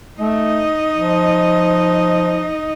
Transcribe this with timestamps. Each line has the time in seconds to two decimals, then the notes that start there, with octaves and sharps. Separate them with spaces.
0.20 A3 D#4 D#5
0.94 F3